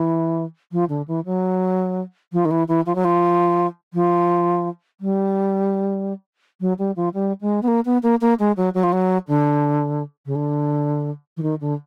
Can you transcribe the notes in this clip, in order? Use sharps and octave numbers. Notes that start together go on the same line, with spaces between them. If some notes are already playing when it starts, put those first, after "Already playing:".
Already playing: E3
F3
D3
E3
F#3
F3
D#3
E3
E3
F3
F#3
F3
F3
G3
F#3
G3
F3
G3
G#3
B3
A#3
B3
A#3
A#3
G#3
F#3
F#3
F3
F#3
D3
C#3
D3
E3
D#3
D3